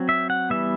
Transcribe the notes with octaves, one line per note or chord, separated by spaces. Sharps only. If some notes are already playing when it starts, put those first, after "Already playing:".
Already playing: F#3 C4
E5
F#5
E3 G3 B3 E5